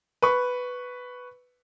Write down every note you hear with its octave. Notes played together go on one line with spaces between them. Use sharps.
B4 C#6